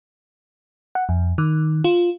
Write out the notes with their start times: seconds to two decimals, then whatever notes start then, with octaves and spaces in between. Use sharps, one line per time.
0.95 F#5
1.09 F2
1.38 D#3
1.84 F4